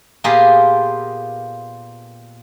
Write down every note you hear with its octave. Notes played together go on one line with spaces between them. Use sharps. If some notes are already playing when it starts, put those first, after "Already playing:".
A#2 A#3 B3 F4 G4 G#4